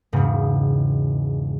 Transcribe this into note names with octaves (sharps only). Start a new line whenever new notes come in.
E1 G#2 C#3